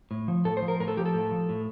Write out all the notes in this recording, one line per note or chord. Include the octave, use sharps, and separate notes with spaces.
A2
F3
A2 A4
C5
F3
A#4
A2 A#4
A4
F3 G4
A4
A2
F3
A2